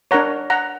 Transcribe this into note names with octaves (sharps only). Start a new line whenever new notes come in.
D4 A#4 C#5 F#5 A#5
F#5 A#5